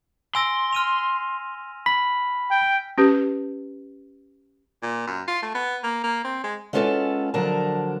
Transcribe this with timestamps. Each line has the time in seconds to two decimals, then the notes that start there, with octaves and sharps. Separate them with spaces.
0.35 G#5 C6 E6 A#6
0.73 F6 D#7 F7
1.86 B5 B6
2.51 G5
2.98 C#4 G4 B4
4.83 A#2
5.07 F#2
5.28 F4
5.42 A3
5.55 B3
5.84 A#3
6.04 A#3
6.25 C4
6.44 G#3
6.73 G#3 B3 C#4 F4 F#4 A4
7.34 D3 F3 F#3 D4 A#4 A5